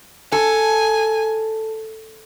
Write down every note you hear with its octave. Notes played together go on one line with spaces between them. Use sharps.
A4 G#5